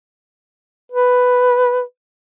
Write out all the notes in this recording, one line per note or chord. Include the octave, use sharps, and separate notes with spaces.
B4